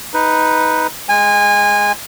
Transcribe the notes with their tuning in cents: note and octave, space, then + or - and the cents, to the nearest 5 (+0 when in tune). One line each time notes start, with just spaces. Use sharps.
D#4 +10 B4 +0
G#3 +0 G#5 -25